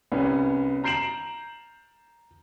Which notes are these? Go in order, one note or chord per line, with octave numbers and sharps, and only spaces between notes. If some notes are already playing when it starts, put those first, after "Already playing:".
C2 B3 C#4
A#5 G6 C7 D7 E7 F#7